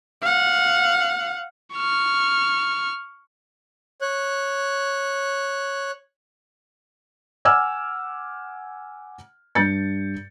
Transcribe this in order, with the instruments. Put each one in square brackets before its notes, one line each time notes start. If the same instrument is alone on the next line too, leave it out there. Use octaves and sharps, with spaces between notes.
[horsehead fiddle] F5 F#5
[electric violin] C#6 F6
[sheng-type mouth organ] C#5 F#6
[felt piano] F#5 G#5 D6 E6 F6 G#6
G2 G6 A6 C#7